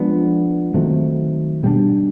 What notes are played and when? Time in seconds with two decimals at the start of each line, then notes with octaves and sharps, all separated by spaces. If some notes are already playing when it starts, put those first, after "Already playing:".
Already playing: F3 G#3 B3 D4
0.74 D#3 F#3 A3 C4
1.63 B2 G3 A#3 D4